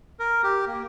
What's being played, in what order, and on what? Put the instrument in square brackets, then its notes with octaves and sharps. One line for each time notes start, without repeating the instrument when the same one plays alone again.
[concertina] A#4
G4
A#3